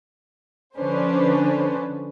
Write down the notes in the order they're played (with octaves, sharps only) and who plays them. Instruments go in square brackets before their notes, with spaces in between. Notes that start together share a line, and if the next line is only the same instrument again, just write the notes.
[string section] D3 F3 C#4 D4 B4 C5